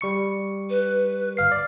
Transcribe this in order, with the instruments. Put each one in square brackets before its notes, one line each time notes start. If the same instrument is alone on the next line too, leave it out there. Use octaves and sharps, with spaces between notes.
[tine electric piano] G3 C#6 C#7
[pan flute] B4
[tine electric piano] G1 F5 C7 [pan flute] F6
[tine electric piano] D5